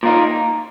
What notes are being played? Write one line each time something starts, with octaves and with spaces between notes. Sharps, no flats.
A#2 A#3 D#4